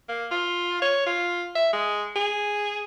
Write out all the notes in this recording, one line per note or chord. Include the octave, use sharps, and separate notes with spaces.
A#3
F4
C#5
F4
E5
G#3
G#4